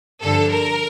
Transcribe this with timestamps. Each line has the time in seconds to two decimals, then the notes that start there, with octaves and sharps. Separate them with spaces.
0.22 G2 D3 F3 A4
0.51 A#4